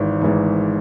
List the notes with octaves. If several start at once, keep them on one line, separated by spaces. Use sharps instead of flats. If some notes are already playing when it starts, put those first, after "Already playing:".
Already playing: G#1 G#2 E3
G#1 G#2 E3